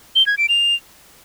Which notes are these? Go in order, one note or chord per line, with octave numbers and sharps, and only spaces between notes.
G7
G#6
D7
F7